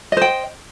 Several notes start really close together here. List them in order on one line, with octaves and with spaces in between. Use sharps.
D#5 C5 G5